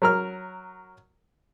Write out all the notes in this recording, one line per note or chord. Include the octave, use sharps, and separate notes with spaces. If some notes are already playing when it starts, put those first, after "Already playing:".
F#3 A#4 F6